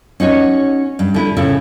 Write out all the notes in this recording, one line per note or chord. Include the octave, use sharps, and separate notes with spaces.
C#4 D#4 F#4 C#5
G2
D3 E4
A2 C#3 A3 E4